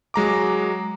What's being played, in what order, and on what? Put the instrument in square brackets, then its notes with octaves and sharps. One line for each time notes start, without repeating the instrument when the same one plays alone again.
[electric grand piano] F#3 G#3 A#5 D6